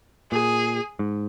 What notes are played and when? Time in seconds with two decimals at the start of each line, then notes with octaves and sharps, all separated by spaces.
0.31 A#2 G#4
0.99 G#2